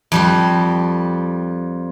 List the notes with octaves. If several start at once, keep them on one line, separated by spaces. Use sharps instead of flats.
F2 G3 G4